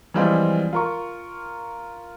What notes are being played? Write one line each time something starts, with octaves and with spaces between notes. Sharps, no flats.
E3 F3 G3 G#3 C4 F4
F4 A#4 C#6